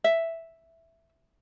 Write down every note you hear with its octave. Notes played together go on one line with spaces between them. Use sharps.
E5